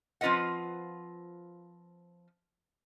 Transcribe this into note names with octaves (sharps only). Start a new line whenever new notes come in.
F3 C4 F4 B4 D#5 F#5